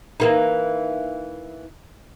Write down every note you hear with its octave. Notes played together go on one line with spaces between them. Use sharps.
E3 A#3 D#4